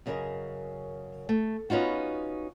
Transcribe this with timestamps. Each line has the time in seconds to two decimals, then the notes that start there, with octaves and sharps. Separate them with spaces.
0.06 F#2 C#3 D#4 G#4 A#4 D#5
1.29 A3
1.70 B3 C#4 D#4 F4 F#4